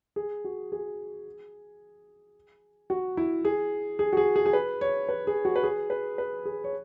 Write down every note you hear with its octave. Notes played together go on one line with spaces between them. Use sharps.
G#4
F#4
G#4
F#4
E4
G#4
G#4
F#4
G#4
G#4
G#4
B4
C#5
B4
G#4
F#4
B4
G#4
B4
B4
G#4
C#5